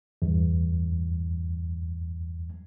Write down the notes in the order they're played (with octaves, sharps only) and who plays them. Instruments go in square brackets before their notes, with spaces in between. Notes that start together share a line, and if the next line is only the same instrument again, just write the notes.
[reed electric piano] E2 G2